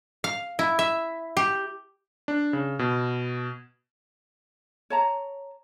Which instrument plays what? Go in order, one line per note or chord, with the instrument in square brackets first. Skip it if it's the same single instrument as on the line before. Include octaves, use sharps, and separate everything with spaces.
[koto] F5
E4
E5
G4
[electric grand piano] D4
C#3
B2
[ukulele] C#5 A5 A#5